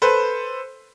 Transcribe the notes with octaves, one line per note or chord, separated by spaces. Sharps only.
A4 B4 C5